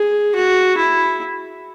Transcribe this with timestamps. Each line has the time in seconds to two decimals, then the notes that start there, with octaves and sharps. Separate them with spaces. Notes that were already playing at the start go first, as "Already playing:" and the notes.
Already playing: G#4
0.35 F#4
0.77 E4